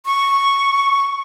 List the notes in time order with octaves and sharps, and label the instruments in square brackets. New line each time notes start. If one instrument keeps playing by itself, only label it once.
[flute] C#6